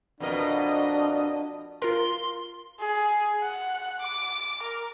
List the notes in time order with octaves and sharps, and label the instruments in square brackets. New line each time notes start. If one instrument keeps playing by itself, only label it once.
[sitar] F2 B2 A#4 [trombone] D4 [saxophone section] D#5
[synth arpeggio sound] F4 A#4 [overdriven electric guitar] C6
[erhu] G#4
F#5
D6
A#4